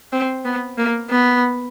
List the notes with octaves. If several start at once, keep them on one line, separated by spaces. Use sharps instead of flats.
C4
B3
A#3
B3